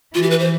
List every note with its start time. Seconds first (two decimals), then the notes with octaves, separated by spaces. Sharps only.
0.14 E3 F4
0.22 G4
0.30 B4
0.39 C5